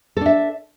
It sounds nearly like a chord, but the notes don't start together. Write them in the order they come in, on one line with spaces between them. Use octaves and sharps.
A4 D4 E5